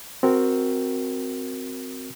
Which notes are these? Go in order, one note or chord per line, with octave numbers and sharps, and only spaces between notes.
C4 F#4 A#4